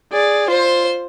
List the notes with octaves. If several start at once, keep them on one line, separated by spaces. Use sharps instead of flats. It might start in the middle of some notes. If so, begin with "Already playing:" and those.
G#4 D5
F4 C5